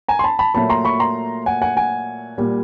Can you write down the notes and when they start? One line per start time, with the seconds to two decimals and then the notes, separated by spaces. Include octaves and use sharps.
0.08 G#5 A#5
0.19 C6
0.24 A5 B5
0.39 A5 B5
0.55 A#2 F#3 A3 A5 B5
0.69 A#5 C6
0.85 B5 C#6
1.00 A#5 C6
1.46 F#5 G#5
1.62 F#5 G#5
1.77 F#5 G#5
2.38 A#2 G3